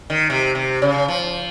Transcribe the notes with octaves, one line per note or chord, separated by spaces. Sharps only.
D#3
C3
C3
C#3
F3